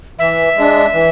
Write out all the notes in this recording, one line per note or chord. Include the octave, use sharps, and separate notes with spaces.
E3 E5
G#3 D4
E3